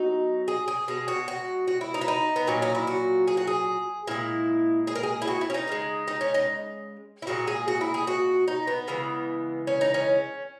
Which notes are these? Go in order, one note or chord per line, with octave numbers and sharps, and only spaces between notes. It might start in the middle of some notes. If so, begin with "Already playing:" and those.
Already playing: B2 F#3 D#4
G#4
G#4
B2 G#3 G#4
F#4
F#4
F#4
E4
D#4
E4
D#4
B3
A#2 F#3 C#4
D#4
E4
F#4
G#4
F#4
G#4
A#2 G#3 E4
G#4
A#4
G#4
E4
F#4
E4
C#4
D#4
C#3 E3 G#3
D#4
C#4
D#4
E4
A#2 G#3 F#4
G#4
F#4
E4
G#4
F#4
D#4
B3
C#3 E3 G#3
C#4
D#4
C#4